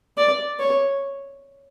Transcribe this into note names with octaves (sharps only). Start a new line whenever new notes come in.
D5
C#5